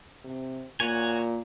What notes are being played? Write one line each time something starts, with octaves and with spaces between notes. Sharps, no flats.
C3
A#2 F#4 C#5 G#5